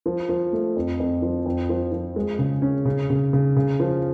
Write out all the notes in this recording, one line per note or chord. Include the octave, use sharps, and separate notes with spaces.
F3
F3
A3
F2
F2
F3
F2
F3
F3
G#3
C#3
C#4
C#3
C#3
C#3
C#3
F3